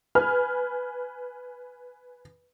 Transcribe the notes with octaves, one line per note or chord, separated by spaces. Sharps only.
B4 G#5 F6